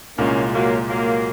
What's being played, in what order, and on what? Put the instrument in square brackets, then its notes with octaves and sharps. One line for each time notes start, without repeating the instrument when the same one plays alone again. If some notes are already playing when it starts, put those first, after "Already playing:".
[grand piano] C2 A#2 G#3 [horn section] A#3 C#4
[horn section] F#3 A#3
F#3 A#3